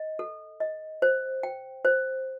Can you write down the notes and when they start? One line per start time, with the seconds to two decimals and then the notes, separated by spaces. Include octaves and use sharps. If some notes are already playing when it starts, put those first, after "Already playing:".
Already playing: D#5
0.19 A4
0.60 D#5
1.02 C5
1.43 G5
1.85 C5